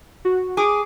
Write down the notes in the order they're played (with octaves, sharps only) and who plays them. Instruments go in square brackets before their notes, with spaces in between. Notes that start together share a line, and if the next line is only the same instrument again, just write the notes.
[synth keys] F#4
[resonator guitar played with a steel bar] G#4 [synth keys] D6